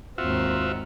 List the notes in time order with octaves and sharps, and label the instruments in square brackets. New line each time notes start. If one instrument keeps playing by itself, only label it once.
[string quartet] D#2 G#2 C4 [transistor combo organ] F4 F#4 E5